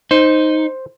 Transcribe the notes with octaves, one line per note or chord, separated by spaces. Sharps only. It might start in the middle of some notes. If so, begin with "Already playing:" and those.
D#4 C5